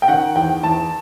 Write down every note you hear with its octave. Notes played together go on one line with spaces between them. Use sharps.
G5
D#3 F#5
E2 G5
E2 A5